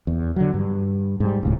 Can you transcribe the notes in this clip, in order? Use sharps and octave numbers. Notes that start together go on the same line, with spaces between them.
E2
D3 F#3
G2
G#2 G3
D#1 C#2 A2